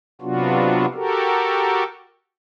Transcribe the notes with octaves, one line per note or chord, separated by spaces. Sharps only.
C3 F#3 B3 D4 F4 F#4
F#4 G4 A4 A#4